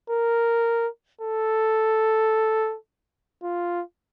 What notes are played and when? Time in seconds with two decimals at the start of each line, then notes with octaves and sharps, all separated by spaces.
0.10 A#4
1.21 A4
3.43 F4